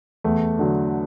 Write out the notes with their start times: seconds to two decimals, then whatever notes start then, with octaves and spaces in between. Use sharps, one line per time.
0.24 E2 A3
0.59 D3 F#3